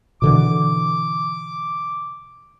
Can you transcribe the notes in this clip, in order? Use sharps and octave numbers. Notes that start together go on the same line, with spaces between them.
B2 D3 E3 D6